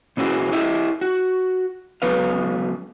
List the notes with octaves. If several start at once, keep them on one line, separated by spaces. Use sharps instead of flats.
B2 C#4 E4 F#4 G#4
E4 G4 D#5 E5
F#4
C#2 F#3 B3 B4 F5